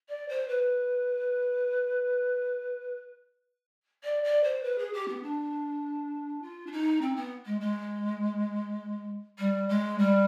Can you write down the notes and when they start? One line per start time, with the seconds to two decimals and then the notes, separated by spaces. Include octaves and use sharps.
0.09 D5
0.29 C5
0.48 B4
4.04 D5
4.24 D5
4.44 C5
4.63 B4
4.78 G#4
4.93 G4
5.08 B3
5.23 D4
6.42 F4
6.66 D4
6.72 D#4
7.01 C4
7.16 B3
7.46 G#3
7.61 G#3
9.38 G3
9.69 G#3
9.98 G3